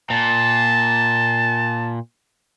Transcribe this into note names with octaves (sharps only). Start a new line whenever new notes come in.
A#2 A5